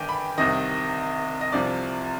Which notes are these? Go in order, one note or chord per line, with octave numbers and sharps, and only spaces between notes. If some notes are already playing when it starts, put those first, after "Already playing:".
Already playing: G1 G2 D#3 D5 G5 G#5
B5
C2 C3 D#3 D#5
D#5
C2 C3 F3 D5